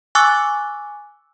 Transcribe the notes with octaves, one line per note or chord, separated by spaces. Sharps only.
G#5 C#6 D6 E6 F#6 A6